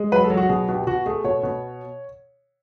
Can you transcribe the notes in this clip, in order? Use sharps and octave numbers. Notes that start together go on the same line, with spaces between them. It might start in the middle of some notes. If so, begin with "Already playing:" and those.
Already playing: G#3
F#3 B4
A4
F#3
F#4
B2 G#4
B2
G4
B2 F#4
A3 G#4
B2 C#5
B2